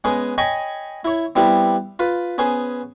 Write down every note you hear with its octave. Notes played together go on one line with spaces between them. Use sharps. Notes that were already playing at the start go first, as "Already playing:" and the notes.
G#3 B3 C#4 G#4
C#5 D#5 G5 G#5 B5 C#6
E4 C#5
G3 B3 C4 E4 G4
F4 B4
B3 C#4 G#4 C5